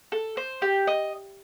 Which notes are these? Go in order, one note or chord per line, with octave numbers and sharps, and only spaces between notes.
A4
C5
G4
D#5